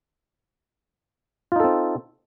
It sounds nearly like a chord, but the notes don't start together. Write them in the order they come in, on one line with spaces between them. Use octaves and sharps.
F4 D#4 A4 C4